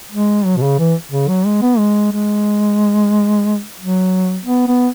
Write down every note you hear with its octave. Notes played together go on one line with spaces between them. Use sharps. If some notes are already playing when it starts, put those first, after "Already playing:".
G#3
F#3
B2
C#3
E3
C#3
F#3
G#3
B3
G#3
G#3
F#3
B3
B3